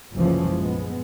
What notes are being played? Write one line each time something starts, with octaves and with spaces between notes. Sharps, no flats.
F#1 C2 E3 F3 G#3 C#4
A#1 G#3 B3